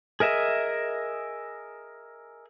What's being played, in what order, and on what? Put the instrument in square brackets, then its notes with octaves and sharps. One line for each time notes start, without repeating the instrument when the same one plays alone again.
[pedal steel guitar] G#4 A#4 D#5 E5